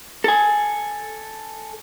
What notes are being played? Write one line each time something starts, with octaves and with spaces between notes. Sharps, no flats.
A4 G#5